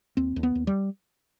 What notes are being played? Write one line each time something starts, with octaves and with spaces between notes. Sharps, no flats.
D#2 C4
D#2
B3
D#2
G3